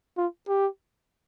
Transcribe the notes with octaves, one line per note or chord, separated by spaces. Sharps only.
F4
G4